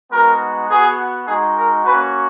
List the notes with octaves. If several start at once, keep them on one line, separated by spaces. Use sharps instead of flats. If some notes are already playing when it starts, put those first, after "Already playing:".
G#3 B3 D#4 F#4 A#4
B3 F#4 G#4
G#3 D#4 F#4 G#4
A#4
A#3 C#4 F#4 B4